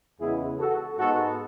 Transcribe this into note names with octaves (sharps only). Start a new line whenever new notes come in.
E2 C#3 G#3 B3 E4 G#4
F#4 A4
G#2 G#3 B3 F#4 A4